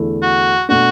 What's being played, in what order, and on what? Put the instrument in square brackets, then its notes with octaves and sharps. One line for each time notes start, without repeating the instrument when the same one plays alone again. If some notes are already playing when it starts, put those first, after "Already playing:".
Already playing: [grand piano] E2 D3 A3 E4
[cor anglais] F#4
[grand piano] B2 A3 D4 [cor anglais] F#4